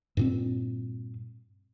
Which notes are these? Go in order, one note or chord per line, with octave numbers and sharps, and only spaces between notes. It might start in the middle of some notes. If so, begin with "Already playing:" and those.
G2 A#2 C4